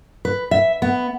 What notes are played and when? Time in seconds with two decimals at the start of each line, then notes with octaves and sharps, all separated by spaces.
0.25 B4
0.51 E5
0.82 B3